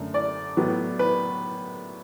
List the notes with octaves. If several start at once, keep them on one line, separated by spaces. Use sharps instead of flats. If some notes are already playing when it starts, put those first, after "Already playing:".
Already playing: F#2 D3 A3
D5
A2 F#3 B3
B4